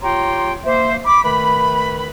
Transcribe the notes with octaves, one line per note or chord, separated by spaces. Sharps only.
F4 G4 C#5 G5 A#5 C6
A#3 C5 E5
B5 D6
D#3 A3 B4 B5